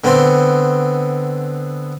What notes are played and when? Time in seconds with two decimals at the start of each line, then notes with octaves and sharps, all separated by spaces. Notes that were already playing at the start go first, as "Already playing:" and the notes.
0.04 D3 B3 C4 C6